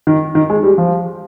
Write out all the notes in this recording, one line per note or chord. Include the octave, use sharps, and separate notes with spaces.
D#3
D#3
G#3
G3
F3